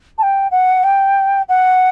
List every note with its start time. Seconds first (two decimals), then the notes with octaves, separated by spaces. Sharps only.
0.18 A5
0.23 G5
0.51 F#5
0.83 G5
1.49 F#5